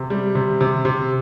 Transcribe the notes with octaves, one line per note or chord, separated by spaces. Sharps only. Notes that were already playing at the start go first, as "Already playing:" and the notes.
Already playing: C3
G3
C3
C3
C3